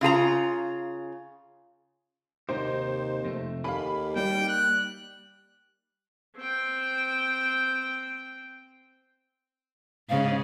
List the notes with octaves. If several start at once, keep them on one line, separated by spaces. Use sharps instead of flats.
C#3 F4 G#4 A#5
D#2 C3 D#4 G4 C5
F2 C3 A3
D#2 G4 A4 F5 G#5 B5
G3 A#3 D#4 G5
F#6
C4 G5
G#2 C#3 F5